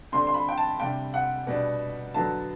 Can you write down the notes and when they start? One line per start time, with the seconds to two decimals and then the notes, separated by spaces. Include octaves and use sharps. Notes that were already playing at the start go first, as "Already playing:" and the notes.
0.12 D3 G3 C4 C6
0.27 C6
0.34 B5
0.49 G5
0.58 A5
0.80 C3 G3 D4 G5
1.14 F#5
1.47 B2 G3 D4
2.14 D3 F#3 B3 A5